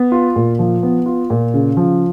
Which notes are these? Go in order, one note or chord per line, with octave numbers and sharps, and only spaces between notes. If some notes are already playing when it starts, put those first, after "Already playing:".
Already playing: B3
F4
A#2
F3
B3
F4
A#2
C#3
F3